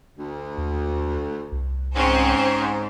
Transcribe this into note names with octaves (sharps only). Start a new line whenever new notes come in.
D2
D#2
C2
G#2 C4 C#4 C5